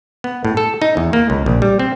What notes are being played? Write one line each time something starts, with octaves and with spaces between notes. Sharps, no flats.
B3
A2
A4
D#4
E2
A#3
C#2
A#1
G3
C4